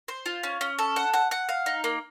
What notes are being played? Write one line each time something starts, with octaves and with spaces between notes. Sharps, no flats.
C5
F4
C#4
C#4
A4
F#5
F#5
F#5
F5
D#4
A#3